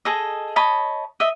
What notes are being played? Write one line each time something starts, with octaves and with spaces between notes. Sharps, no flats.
G#4 A4 D#5
C#5 D#5 A5 B5
D#5 E5